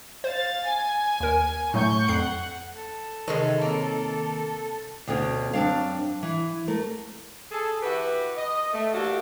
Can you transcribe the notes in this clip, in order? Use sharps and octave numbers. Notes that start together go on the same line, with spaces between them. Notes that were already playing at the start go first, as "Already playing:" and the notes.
C5 F5 A6
G#5
D#2 A#4
A2 F#3 A3 C#6 G6
F2 F#5 C7
A4
C3 D#3 E3 G#3 C#4 C5 D#6
A#3 C4 C#5
D2 B2 D3 C#4 F4
F#2 C4 D4 F5
E3
A3 A#4
G#4 A4
E3 F#4 G4 B4
D#5
A3
E3 A3 A#3 D4 F#4 G4